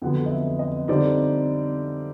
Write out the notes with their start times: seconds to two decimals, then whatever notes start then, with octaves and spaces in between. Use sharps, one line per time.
0.02 F2 D3 F#3 B3 F#5
0.26 D#5
0.31 E5
0.59 D#5
0.88 D3 G3 C4 D#4 D5